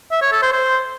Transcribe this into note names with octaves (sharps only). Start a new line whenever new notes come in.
E5
C#5
A4
C5
C5